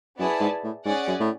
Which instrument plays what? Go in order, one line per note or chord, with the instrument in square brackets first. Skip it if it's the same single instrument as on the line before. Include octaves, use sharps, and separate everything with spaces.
[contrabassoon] F#2 [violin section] B3 E4 G#4 D5 A5
[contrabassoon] G#2
A2
[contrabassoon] G#2 [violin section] C#4 G#4 D5 F#5
[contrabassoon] F#2
A2